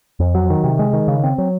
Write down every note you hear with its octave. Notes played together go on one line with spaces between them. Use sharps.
F2
F#3
D#3
C3
G#3
D#3
C#3
C4
F#3